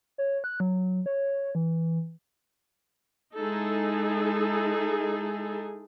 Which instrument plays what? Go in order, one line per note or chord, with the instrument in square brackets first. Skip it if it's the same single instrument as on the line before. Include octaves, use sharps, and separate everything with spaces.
[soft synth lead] C#5
F#6
F#3
C#5
E3
[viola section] G#3 D#4 E4 G#4 A4